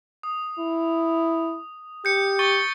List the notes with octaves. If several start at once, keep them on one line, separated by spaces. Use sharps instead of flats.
D#6
E4
G4 G6 C#7
C#6 A6 G7